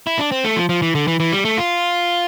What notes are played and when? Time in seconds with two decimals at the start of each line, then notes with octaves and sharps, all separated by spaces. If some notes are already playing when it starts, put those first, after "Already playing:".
0.07 E4
0.19 D4
0.32 C4
0.44 A3
0.56 F3
0.69 F3
0.82 E3
0.95 D3
1.08 E3
1.20 E3
1.32 G3
1.45 A3
1.58 F4